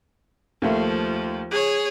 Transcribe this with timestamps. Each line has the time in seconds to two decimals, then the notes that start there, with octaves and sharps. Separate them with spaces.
0.62 D#2 F3 A3
1.51 G#4 C#5